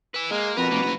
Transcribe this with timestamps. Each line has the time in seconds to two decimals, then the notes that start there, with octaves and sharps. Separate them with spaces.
0.14 E4 B4
0.31 G#3 A#3
0.57 F2 F#4 A#4 B4
0.71 F1 A#3
0.84 F#1 F3 A#5